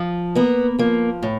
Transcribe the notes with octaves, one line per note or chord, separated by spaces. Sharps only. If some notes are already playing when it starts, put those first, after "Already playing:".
Already playing: F3
A#3 B3
F3 A#3
A2